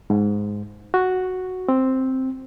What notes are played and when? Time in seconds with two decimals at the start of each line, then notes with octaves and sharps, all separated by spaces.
0.10 G#2
0.94 F#4
1.69 C4